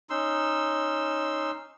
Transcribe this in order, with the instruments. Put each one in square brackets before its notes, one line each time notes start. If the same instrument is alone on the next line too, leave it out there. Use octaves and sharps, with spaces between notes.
[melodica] C#4 D#4 C6 E6